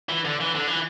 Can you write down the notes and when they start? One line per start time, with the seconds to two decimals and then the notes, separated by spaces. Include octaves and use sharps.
0.09 E3
0.25 D3
0.41 E3
0.55 D3
0.68 E3